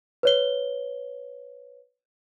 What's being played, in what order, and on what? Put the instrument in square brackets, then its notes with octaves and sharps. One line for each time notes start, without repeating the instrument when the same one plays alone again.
[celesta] B4 C#5 G7